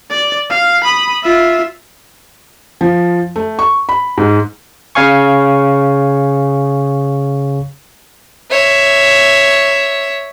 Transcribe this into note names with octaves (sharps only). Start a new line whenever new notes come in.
D5
F5
B5 D#6
F4 E5
F3
A3
C#6
B5
G#2
C#3 C#5 F5 G#5 C#6
C#5 E5